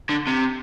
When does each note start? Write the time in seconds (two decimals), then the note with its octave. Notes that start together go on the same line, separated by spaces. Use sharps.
0.10 D3
0.28 C3